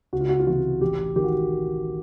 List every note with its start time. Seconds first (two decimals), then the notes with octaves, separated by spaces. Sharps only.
0.13 C#2 F#4
0.21 F4
0.29 F#4
0.39 F4
0.47 C3 E3 F#4
0.81 A1 G4
1.16 D#3 G4
1.24 F#4